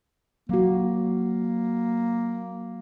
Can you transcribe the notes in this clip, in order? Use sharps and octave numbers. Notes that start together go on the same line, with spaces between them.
F#3 A#3 F#4